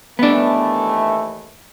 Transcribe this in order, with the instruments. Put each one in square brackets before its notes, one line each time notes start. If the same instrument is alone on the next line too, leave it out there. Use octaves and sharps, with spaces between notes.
[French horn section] D#2 E3 A3 [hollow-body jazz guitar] B3 D4